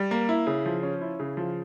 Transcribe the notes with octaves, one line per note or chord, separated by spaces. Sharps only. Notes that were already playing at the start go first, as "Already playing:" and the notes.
Already playing: G3
A#3
E4
C#3
F3
C#4
E4
C#3
F3